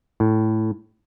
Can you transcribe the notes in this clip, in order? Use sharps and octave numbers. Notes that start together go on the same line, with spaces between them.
A2